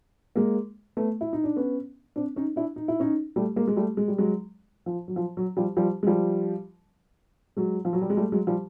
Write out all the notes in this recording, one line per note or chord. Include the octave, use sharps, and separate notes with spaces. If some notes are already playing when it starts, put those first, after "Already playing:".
G#3 A#3
A3 B3
E4
D#4
D4
B3 C#4
C4 D4
C#4 D#4
D4 E4
D#4
E4
C#4 D#4
G3 A3
G#3 A#3
G#3
G3 A3
G#3
G3
F#3 G#3
F3
F#3
F3
F#3
F3 G3
F3 G3
G#3
F3 G3
F#3 G#3
F3
F#3
G3
G#3
G3 A3
F#3 G#3
F3 G3